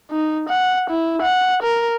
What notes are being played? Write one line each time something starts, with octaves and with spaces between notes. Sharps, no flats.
D#4
F#5
E4
F#5
A#4